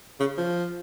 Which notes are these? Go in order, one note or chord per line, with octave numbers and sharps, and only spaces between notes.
C#3
F3